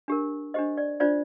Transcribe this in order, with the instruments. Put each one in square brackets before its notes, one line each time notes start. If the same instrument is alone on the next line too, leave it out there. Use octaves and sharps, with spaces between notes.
[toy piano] D4 G4 A#4
D4 G4 C5 D#5
D5
D4 F4 C5 D5